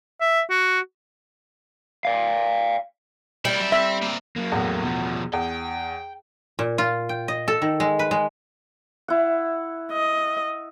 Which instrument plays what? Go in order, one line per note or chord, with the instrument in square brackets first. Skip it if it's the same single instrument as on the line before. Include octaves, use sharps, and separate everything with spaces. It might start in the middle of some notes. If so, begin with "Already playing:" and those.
[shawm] E5
F#4
[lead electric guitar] D5 F5
[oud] G3 [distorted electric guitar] A#3 E4
[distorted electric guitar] F#3 E5
[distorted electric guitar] C4 [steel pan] E5
[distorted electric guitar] A#3 C4
[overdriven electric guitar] F#3 A#3
[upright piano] E2 A2
[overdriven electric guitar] B2 F3
[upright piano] E2 [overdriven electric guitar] G5
[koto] A#2
F4
G5
D#5
A4
D#3
G#3
B4
G#3
[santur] E4 F#5
[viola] D#5